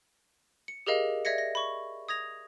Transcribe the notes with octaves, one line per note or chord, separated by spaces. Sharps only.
C#7
G4 G#4 A#4 D#5 F5
D5 E5 G#6 A#6 C#7
A#6
B5 C#6
D#6 G#6 A#6 F7